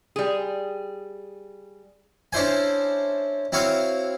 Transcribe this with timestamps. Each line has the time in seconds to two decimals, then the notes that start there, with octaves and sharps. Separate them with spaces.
0.16 G3 G#4
2.33 C#4 D4 E4 C5 G#5
3.52 C4 E4 F#4 C#5 F5